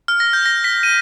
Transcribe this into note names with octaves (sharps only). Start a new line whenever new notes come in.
F6
A#6
G6
A#6
B6
D#7